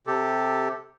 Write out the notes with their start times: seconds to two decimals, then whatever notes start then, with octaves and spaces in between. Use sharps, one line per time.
0.07 C3 G4 A4